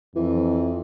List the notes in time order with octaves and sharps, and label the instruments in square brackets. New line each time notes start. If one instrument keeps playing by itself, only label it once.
[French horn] F2 [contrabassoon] E3